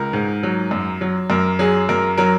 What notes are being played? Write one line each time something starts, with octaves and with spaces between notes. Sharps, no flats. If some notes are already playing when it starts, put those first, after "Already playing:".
Already playing: C#2 A#4
G#2
F#3
F#2
F#3
F#2 A#4
F#3 G#4
F#2 A#4
F#3 A#4